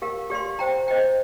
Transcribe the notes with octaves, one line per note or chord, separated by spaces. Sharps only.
G4 A#4 F5
G4 D5 F5 C6
C5 G5 A#5
C5 D#5 G5